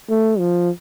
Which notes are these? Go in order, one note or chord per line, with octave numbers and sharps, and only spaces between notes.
A3
F3